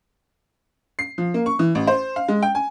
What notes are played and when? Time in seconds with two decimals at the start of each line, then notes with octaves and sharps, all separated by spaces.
0.99 C7
1.18 F3
1.34 A#3
1.46 C#6
1.59 E3
1.75 A1
1.87 C5
2.16 F5
2.28 G#3
2.43 G5
2.55 G#5